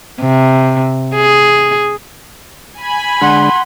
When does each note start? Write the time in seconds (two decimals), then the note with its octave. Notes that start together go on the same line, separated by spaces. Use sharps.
0.21 C3
1.14 G#4
2.78 G#5 B5
3.21 D3 G#3 D4 F#5 C6